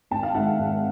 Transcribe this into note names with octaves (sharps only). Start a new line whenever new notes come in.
G#1 G5 A5
F5
G#2 D#3 E5 F#5
G#1